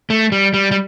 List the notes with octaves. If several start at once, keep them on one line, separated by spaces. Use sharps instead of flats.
A3
G3
G3
G3